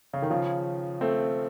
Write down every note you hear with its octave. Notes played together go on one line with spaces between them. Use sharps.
C#3
D#3
C#3 F3
A3 C4